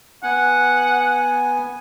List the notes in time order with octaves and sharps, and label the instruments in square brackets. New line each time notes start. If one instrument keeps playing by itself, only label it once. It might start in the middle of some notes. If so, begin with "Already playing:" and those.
[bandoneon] B3 G#5 [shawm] F#5